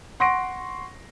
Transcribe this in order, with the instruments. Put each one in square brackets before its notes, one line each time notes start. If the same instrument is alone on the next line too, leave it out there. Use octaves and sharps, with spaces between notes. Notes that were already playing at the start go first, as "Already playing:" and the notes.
[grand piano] F#5 C6 C#6 A#6 C7 D7